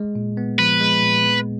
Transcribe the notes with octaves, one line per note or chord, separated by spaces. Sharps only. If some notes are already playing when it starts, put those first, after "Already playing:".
Already playing: G#3
A#2
B3
F3 B4
G#3
A#2
B3